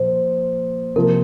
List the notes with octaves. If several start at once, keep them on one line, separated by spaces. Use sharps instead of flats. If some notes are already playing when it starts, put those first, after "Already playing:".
Already playing: A#2 F3 F4 C5
C3 F3 A#3 A#4